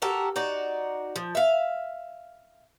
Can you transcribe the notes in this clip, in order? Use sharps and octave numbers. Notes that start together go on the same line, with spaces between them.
F#4 G4 A4 A#4
D#4 F#4 D5
F3
E5 F5